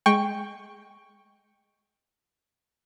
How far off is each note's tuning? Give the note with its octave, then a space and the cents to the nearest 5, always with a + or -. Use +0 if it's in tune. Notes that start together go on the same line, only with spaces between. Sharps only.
G#3 +0 G5 +10 C#6 +0